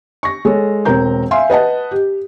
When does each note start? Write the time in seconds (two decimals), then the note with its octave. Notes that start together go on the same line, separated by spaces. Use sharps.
0.23 C#6 A#6
0.45 G#3 A4 C#5
0.85 E1 C4 A#4 A#5 G6
1.31 E5 F5 G#5 C6
1.50 B4 D#5 F#5 A5
1.91 G4